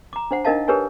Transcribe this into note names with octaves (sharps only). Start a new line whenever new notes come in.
A#5 D6
D4 C5 F#5
D4 D#4 A#4 D#5 F5 A5
G4 A#4 B4 C#5 G#5